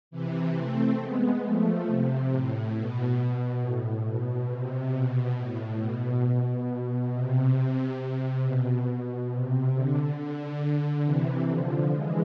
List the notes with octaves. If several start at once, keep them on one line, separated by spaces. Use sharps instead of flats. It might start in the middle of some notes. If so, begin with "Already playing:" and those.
C3 E3
A3 C4
G#3 B3
F3 A3
C3
A2
B2
A2
B2
C3
B2
A2
B2
C3
C3
B2
C3
D3
D3
C3 E3
D3 F3
E3 G#3